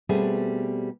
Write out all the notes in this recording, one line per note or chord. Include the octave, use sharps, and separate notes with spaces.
B2 G3 A3 B3 C4 G#4